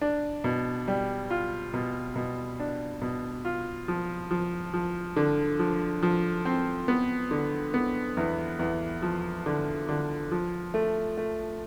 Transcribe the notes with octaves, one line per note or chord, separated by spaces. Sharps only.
D4
B2
G3
F4
B2
B2
D4
B2
F4
F3
F3
F3
D3
F3
F3
C4
B3
D3
B3
E2
E2
F3
D3
D3
F3
A3
A3